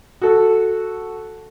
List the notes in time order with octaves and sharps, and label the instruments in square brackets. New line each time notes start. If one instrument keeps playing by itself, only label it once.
[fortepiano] F#4 A4